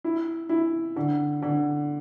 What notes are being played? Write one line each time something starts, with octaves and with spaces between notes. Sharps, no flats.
E4
E4
D3
D3